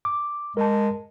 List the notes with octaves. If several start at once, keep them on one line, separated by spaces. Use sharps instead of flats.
D6
G#3 A#4 A5